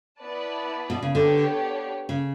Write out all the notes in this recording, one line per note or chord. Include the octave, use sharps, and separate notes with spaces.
B3 E4 B4 D5 A5
B2
C#3
D3 B3 D4 G4 C#5
C#3